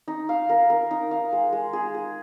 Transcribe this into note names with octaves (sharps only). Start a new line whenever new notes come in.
D#4
F5
A#4
A#4
D#4
F5
G#3
G#3
G#4
G#4